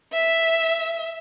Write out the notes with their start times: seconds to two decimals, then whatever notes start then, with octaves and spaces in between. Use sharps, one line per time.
0.13 E5